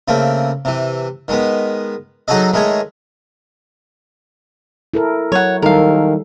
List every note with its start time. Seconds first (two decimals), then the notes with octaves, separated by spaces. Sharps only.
0.08 C#3 A3 A#3 C4
0.65 C3 E3
1.28 D#3 G#3 B3
2.28 F#3 D#4 F#4 G#4 A4 D#5
2.53 D#3 G#3 A3 G#4 C#5
4.94 E4 A4 A#4
5.32 F#3 C#5 F#5
5.62 D#3 G3 A4 A#4 F5